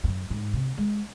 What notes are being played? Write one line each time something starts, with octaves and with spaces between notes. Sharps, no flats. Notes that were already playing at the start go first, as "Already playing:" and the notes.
E2
F#2
G#2
C3
G#3